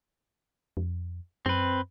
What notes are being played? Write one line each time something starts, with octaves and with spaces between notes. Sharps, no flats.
F2
F#2 C4 B4